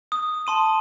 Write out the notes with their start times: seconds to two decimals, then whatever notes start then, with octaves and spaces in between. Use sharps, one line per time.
0.12 D#6
0.47 A5 C6 D#7